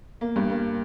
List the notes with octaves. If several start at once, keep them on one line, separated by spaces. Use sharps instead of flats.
A#3
G2
A#3